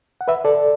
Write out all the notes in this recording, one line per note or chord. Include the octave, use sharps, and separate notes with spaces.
F#5
B4 E5
A4 D5